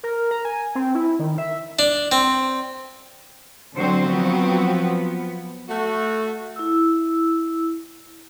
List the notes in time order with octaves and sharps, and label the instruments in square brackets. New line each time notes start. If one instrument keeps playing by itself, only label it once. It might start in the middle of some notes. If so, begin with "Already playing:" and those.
[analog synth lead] A#4
A#5
G#5
C4
E4
D#3
E5
[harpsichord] D4
C4
[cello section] D3 C5 [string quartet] F#3 C4
[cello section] F3 B3
[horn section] A3 F#4
[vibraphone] E4 E6